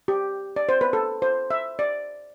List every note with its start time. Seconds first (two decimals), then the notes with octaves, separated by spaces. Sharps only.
0.08 G4
0.56 D5
0.69 C5
0.81 B4
0.93 A4
1.22 C5
1.51 E5
1.79 D5